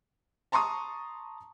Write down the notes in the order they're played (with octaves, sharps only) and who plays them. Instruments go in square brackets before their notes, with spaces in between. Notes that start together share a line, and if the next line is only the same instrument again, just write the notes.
[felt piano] A5 A#5 C6 C#6 D#6